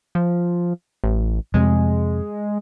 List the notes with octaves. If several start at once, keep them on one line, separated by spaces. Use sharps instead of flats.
F3
A1
F2 C3 G#3